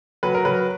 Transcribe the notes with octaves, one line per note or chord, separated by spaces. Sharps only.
F#3 B4
A#4
F#3 B4